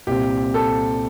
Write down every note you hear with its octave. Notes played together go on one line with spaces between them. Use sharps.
C2 A#2 G3 C4 G4
A4